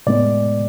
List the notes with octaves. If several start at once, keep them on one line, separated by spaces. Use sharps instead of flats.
A2 G#3 B3 D5